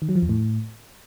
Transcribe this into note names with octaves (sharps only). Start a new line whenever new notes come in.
D#3
F#3
F3
E2
A2